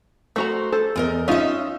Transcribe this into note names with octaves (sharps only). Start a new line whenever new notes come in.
A3 F#4 C5 A#5
A4 C5
E2 A#4 D#5
C#4 D#4 F4 D#5 E5